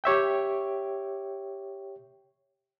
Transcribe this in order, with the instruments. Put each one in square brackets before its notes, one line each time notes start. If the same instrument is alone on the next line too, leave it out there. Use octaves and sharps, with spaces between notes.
[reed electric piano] G4 C#5 E5 G5